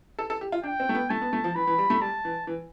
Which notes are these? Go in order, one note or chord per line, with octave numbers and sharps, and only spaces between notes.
A4
A4
G4
F4
D4 G5
C4
A3
B3
A3 A5
B3
A3
F3
E3 B5
E3
G3
A3
G3 A5
E3
E3